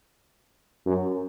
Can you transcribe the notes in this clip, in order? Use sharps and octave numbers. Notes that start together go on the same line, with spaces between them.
F#2